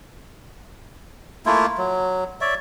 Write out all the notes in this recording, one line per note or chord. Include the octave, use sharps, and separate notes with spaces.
A3 A#3 E4 F4
F#3
C#5 D5 E5